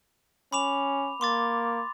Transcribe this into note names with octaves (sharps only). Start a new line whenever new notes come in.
C#4 B5 D6 F7
A#3 C6 D6 A6